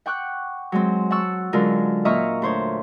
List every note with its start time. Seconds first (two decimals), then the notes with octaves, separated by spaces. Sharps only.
0.06 F#5 G5 C#6 D6 F#6
0.72 F#3 G#3 C4
1.11 F#5 A5 C#6 E6
1.53 D3 F#3 G#3 C#4 F4 A#4
2.05 A#2 D#5 E5 A#5 C#6 F6
2.42 D2 C5 C#5